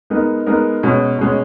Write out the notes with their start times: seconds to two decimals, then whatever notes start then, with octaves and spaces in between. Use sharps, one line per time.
0.10 G#3 B3 D#4 A#4
0.47 G#3 B3 D#4 A#4
0.83 B2 G#3 C#4
1.19 B2 G#3 C#4